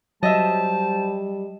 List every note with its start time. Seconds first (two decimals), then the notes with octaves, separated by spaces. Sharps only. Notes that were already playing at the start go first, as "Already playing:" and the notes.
0.23 F#3 G3 C5 D#5 E5 G5 A5